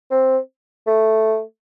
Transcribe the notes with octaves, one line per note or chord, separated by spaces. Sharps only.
C4
A3